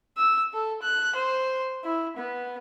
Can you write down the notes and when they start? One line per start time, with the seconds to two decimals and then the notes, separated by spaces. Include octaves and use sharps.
0.17 E6
0.53 A4
0.82 F#6
1.15 C5
1.84 E4
2.17 B3